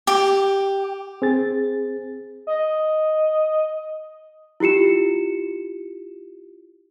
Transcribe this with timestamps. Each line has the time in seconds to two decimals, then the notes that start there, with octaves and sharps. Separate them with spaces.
0.07 G4
1.22 C4 G#4 A6
2.47 D#5
4.60 E4 F4 G4 C#7 E7